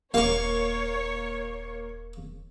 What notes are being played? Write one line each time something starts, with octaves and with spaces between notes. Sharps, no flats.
D#1 A#3 C#5 F5 C#6